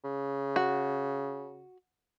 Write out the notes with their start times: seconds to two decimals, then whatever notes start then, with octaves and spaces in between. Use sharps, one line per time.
0.04 C#3
0.56 F#4